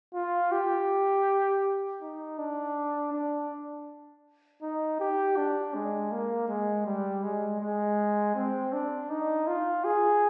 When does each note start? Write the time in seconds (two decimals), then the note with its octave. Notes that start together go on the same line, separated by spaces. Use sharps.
0.14 F4
0.52 G4
2.01 D#4
2.39 D4
3.13 D4
4.62 D#4
5.00 G4
5.37 D4
5.74 G#3
6.12 A#3
6.48 G#3
6.86 G3
7.23 G#3
7.61 G#3
8.35 C4
8.73 D4
9.10 D#4
9.47 F4
9.85 G#4